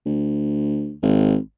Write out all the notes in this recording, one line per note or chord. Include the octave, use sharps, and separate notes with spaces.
D2
G#1